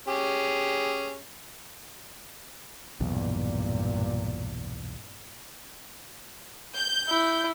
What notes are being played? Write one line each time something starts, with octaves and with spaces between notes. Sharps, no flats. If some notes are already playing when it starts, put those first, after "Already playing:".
C#4 G4 G#4
B1 E2 G2 A#2
G6
E4